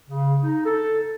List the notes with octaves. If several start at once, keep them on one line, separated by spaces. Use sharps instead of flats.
C#3
D#4
A4